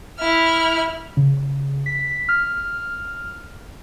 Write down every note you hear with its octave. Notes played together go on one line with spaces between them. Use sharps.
E4 F6
C#3
B6
F6